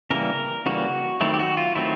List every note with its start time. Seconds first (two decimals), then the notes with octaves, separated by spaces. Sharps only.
0.10 C#3 E3 G3 A#3 A#4
0.66 C#3 E3 G3 A#3 F#4
1.21 D#3 F#3 A3 C4 E4
1.34 G4
1.39 F#4
1.57 F4
1.75 D#3 F#3 A3 C4 E4